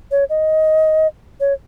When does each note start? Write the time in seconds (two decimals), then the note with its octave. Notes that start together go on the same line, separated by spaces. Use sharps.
0.11 C#5
0.30 D#5
1.40 C#5